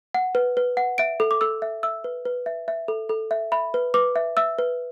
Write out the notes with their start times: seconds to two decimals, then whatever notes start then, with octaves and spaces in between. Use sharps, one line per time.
0.14 F#5
0.35 B4
0.57 B4
0.77 F#5
0.98 E5 D7
1.20 A4
1.31 D6
1.41 A4 E6
1.62 E5
1.83 E5 E6
2.04 B4
2.25 B4
2.46 E5
2.68 E5
2.88 A4
3.09 A4
3.31 E5
3.52 E5 B5
3.74 B4
3.94 B4 D6
4.16 E5
4.37 E5 E6
4.59 B4